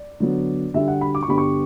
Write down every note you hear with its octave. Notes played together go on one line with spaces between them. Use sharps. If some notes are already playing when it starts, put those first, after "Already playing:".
Already playing: D5
D3 F#3 B3
D3 G3 D4 E5
F#5
B5
D6
C#6
G2 D3 G3 B3 D4 B5
C#6